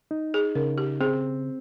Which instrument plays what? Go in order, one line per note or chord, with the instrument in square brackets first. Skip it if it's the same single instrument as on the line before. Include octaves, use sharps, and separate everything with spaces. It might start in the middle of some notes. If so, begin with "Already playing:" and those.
[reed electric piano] D#4
[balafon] G#4
[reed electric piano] C#3 [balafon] A#4
[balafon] G4
[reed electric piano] C4 [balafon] G#4